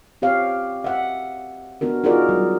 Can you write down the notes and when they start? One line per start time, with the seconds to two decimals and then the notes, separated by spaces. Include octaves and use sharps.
0.22 C4 G4 C#5 F5
0.84 E5 F#5
1.81 B3 D4 F#4 A#4
2.04 D#4 F4 F#4 G#4 A#4 D5
2.29 F#3 G3